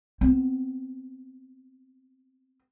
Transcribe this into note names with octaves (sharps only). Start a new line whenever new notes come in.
B3 C4